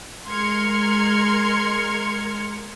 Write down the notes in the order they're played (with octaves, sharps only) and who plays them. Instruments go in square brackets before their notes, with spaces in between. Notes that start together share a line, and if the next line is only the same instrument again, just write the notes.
[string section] G#3 A#4 C6 F6 G#6 C#7